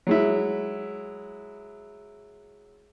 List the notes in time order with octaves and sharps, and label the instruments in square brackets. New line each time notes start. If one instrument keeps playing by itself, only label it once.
[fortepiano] F#3 G#3 E4